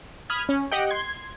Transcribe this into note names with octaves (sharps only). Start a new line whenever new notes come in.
B5 D#6 F6 G#6
C#4
G4 D#5 F#5 G5
C6 G#6